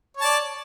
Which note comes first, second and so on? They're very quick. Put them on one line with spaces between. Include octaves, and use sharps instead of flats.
C#5 A5 D5